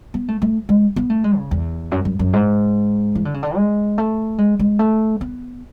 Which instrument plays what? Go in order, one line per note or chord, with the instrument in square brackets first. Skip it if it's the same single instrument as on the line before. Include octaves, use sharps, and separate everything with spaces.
[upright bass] B3
A3
A3
G#3
B3
A3
G#3
C#3
E2
F#2
F#2
F#2
G#2
E3
D3
C#3
D3
G#3
A3
G#3
G#3
A3
B3